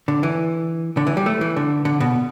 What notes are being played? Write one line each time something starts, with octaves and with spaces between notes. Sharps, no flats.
D3
E3
D3
E3
G3
A3
E3
D3
D3
B2